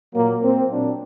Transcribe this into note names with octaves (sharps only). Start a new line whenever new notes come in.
A#2 F#3 A#3
C4
A#2 F#3 D4